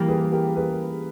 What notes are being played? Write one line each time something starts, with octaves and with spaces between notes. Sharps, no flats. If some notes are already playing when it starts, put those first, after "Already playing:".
Already playing: E3 G3 A#3 G4 A#4
G#4 B4
G4 A#4
G#4 B4